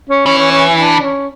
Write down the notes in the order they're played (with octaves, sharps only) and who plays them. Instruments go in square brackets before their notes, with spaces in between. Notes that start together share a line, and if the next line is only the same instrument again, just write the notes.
[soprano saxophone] C#4
[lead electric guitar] E3 [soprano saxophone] C#4
[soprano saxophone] C#4
C#4
D4
C#4